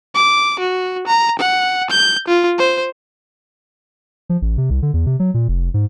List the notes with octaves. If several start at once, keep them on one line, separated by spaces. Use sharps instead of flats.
D6
F#4
A#5
F#5
G6
F4
C5
F3
A1
C3
C2
D3
E2
C3
F#3
A#2
F1
G#2